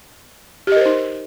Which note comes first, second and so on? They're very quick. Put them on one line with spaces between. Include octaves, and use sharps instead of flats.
G4 D#5 A#4 C5 D#4